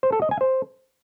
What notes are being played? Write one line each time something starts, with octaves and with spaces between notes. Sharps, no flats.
C5
A4
D#5
G#5
C5